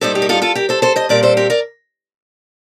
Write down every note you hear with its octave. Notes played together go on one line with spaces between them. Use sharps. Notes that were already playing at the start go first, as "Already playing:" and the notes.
A2 G3 A#3 D#4 A4 C5
G4
A#4
F4 A4
F4 A4
G4 A#4
A4 C5
A4 C5
C5 D#5
A#2 G3 C4 A#4 D5
A4 C5
G4 A#4
A#4 D5